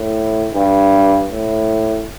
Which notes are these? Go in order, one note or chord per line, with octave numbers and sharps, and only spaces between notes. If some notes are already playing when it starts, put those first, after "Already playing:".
Already playing: A2
G2
A2